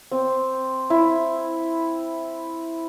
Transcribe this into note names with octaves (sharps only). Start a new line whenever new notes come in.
C4
E4